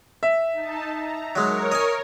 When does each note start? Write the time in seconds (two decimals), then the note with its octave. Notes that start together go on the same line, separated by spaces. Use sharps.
0.23 E5
0.53 D#4 A5
0.95 A#5
1.35 F#3 G#3 A#4 C#5
1.72 D#5 G#5